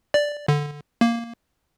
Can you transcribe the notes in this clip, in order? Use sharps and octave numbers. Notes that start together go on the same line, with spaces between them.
D5
D3
A#3